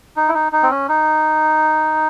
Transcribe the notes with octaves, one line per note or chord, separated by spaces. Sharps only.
D#4
E4
D#4
D#4
C4
C#4
D#4